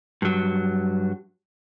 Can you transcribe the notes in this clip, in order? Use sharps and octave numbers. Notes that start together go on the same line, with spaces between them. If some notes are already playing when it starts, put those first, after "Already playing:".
G2 F#3